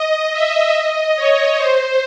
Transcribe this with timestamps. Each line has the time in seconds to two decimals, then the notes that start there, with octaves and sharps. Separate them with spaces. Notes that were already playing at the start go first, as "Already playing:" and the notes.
Already playing: D#5
0.33 E5
0.75 D#5
1.17 C#5
1.58 C5